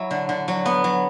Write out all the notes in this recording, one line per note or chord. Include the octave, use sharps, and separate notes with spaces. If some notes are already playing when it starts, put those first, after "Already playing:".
Already playing: F#3 E4
D3
D3
F#3
B3
F#3